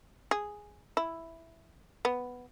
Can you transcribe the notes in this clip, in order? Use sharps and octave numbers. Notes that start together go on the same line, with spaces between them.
G#4
E4
B3